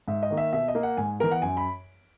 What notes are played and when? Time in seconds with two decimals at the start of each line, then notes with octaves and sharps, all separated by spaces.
0.08 G#2 E5
0.23 D#5
0.30 D#3 A#3
0.37 E5
0.53 B2 E5
0.68 D#5
0.75 A#3
0.83 F#5
0.97 G#2 G#5
1.20 E3 B3 A#4
1.31 F#5
1.42 F#2 G#5
1.57 B5